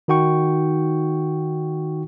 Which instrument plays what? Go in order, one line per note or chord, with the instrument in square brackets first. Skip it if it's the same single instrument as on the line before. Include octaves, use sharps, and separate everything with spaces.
[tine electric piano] D#3 D#4 F#4 G5 C#6